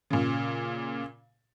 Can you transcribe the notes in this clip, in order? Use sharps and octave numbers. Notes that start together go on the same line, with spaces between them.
A#2 C#3